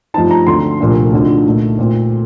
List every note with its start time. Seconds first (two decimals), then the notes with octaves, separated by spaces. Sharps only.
0.14 G2 F3 A3 C4 D#4 A5
0.31 A#5
0.47 D2 D3 A3 C4 C6
0.80 C2 A#2 F3 A3 D4
1.13 D2 D3 F3 C4 D#4
1.46 A#2 A3 D#4
1.79 A#2 A3 C4